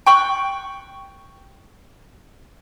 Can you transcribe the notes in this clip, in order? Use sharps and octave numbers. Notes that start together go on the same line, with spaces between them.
G5 C#6 F#6